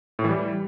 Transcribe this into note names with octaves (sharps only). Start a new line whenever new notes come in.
A2
E3
G3